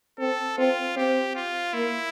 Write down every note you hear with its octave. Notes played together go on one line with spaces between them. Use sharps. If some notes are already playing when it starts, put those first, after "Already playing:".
C4 A4
C4 F4
C4 G4
F4
A#3 E4